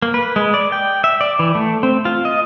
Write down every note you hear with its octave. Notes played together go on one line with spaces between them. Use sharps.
A#3
B4
G#3
D5
G5
E5
D5
E3
A3
C4
F4
D#5